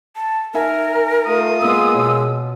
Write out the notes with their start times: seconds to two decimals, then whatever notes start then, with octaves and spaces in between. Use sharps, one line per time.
0.16 A5
0.54 D#4 A#4 E5 G#5
1.27 A3 F4 D#6
1.61 G#3 A#3 B3 E6
1.94 B2 C#5